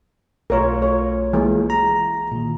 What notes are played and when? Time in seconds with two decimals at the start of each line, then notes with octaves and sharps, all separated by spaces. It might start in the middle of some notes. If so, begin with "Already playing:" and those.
0.50 B1 A3 F4 A#4 C#5
0.82 C#5
1.33 E3 G#3 A#3
1.70 A#5
2.32 A#2 D#3